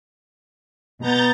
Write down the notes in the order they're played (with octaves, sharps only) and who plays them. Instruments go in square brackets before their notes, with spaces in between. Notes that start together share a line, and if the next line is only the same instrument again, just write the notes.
[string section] B2 B3 [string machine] A#5 G6 A6